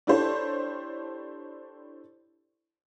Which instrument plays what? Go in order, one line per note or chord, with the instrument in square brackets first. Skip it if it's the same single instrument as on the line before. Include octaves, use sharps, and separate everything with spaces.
[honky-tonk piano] D4 E4 G4 A4 C5 C#5